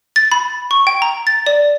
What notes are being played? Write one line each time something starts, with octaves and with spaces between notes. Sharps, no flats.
A6
B5
C#6
G5
A#5
A6
D5